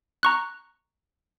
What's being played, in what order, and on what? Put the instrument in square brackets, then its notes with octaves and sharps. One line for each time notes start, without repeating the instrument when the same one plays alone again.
[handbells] A#5 C#6 F#6